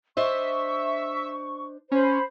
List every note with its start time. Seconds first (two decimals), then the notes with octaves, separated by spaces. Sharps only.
0.17 D4 C5 D#5 E5 C#6
1.92 C#4 C5 B5